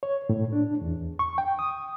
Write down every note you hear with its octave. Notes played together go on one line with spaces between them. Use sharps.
C#5
A2
D4
E2
C#6
G5
D#6